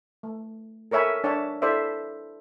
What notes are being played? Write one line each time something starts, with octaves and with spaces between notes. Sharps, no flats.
A3
A4 A#4 C#5 E5 G#5 B5
D4 C#5 E5 A5
E4 A4 C5 D5 E5